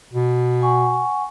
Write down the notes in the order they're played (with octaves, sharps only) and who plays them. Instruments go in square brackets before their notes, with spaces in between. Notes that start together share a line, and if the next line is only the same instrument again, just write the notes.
[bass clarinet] B2
[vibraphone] F#5 G#5 C#6